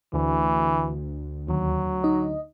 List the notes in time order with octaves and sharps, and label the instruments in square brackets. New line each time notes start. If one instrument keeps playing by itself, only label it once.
[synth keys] D2 [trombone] E3
[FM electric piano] D#2 [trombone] F#3
[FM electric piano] D#4 D#5